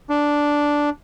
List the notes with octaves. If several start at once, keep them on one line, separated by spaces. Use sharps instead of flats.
D4